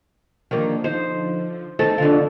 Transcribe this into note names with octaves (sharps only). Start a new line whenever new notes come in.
D3 D#3 F3 G3 A#3
D#4 C5
A3 C4 D#4 A4
F2 D3 F4